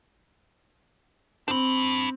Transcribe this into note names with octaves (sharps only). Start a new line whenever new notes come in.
C4 D4 B5